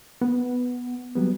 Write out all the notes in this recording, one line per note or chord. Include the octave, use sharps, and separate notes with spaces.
B3
F#3 G3 B3